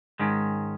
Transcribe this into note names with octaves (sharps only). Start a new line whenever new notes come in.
G#2 D#3 G#3 C#4